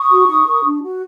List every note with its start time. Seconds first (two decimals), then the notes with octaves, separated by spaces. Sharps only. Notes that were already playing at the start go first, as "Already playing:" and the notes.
Already playing: C#6 D#6
0.11 F#4
0.28 D#4
0.46 A#4
0.64 D4
0.82 F#4